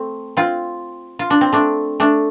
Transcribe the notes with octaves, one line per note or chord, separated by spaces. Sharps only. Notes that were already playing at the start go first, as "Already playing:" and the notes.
Already playing: A3 C4
C4 F4
F4
D4
C4
A3 D4
A3 D4